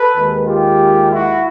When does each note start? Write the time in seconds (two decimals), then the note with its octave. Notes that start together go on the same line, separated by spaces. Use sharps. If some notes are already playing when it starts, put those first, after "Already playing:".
Already playing: A4 B4
0.16 D#2 D#3 G#3
0.47 F4 G4
1.10 E4 F#4